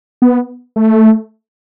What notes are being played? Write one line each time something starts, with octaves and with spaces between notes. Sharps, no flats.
B3
A3